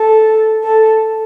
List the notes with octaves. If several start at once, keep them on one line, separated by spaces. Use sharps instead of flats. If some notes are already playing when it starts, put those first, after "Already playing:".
Already playing: A4
A4